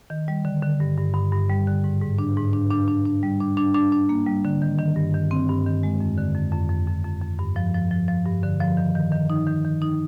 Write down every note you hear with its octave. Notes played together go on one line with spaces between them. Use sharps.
D#3
G3
D3
D3
G2
G2
G2
G2
G3
D3
G#2
G#2
D4
G#2
D4
D4
D4
D4
G3
D4
D4
D4
D4
A#3
G3
D3
D#3
D#3
G2
D#3
C4
G2
D#3
G#3
F2
D3
F2
F2
F2
F2
F2
F2
G2
F3
F3
F3
F3
G2
D3
F3
D#3
D#3
D#3
D#4
D#3
D#3
D#4